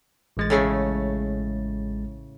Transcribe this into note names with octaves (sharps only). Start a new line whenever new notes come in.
A1 G#3 A6
A2 C#3 A3